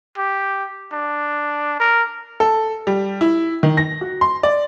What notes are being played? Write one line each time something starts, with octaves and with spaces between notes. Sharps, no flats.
G4
D4
A#4
A4
G3
E4
D#3
A#6
F#4
C6
D5